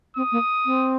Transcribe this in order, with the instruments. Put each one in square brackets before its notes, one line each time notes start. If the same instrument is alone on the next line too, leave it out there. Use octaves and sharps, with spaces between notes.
[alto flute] C4 [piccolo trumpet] D#6
[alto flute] A#3
C4